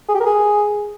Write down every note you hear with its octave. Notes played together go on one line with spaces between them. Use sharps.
G#4
G4
A#4
G#4